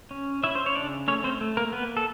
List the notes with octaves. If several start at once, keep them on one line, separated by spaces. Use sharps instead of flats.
C#4
C#4 E4 E5
C5
C#5
C#3 D4 D5
A3 C#4 C#5
C4 C5
A3
A#3 A#4
A#3 B3 B4
A4